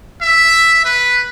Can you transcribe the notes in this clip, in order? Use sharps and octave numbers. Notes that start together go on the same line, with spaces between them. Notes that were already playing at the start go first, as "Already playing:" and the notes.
E5
B4